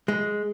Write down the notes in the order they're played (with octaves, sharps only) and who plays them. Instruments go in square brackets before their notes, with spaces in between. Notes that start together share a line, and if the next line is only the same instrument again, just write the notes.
[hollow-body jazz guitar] G#3